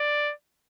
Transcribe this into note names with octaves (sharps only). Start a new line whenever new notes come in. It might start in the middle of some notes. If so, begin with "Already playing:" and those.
Already playing: D5